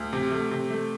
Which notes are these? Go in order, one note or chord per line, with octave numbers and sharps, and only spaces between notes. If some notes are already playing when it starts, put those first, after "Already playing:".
Already playing: D2
C3
A3
C3
A3